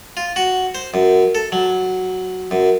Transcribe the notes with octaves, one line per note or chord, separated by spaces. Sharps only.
F4
F#4
C5
F#2
A4
F#3
F#2